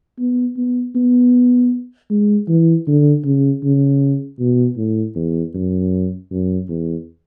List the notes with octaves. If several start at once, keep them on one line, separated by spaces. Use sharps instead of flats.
B3
B3
B3
G#3
E3
D3
C#3
C#3
B2
A2
E2
F#2
F#2
E2